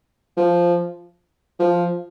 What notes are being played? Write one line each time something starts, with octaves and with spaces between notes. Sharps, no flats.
F3
F3